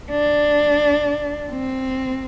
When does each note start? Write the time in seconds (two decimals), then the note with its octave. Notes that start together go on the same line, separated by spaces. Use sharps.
0.11 D4
1.51 C4